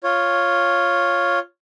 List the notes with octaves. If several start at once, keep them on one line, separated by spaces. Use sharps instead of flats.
F4 C#5